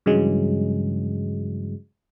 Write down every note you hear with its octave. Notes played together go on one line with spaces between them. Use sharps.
G2 C#3 E3 F#3 G#3